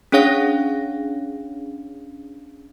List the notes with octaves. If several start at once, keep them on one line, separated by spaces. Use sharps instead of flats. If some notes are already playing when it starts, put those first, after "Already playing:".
C#4 D4 G#4 C#5 F5 A#6